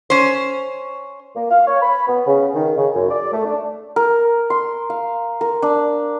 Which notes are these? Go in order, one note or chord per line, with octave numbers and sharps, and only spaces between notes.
C#4 C5
A#3
F5
C#5
B5
B3
C#3
D#3
C#3
F#2
D5
A3
D4
A#4
C6
F5
A#4
D4